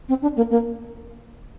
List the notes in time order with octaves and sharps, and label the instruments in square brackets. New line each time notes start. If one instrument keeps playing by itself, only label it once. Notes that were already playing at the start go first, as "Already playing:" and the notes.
[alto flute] C4
D4
A#3
A#3